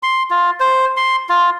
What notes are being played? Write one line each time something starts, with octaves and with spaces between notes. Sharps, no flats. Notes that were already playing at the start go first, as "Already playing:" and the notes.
C6
F4
C5
C6
F4